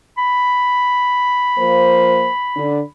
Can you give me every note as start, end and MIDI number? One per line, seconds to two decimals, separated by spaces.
0.17 2.90 83
1.58 2.29 53
1.58 2.29 58
1.58 2.29 72
2.56 2.81 50
2.56 2.81 62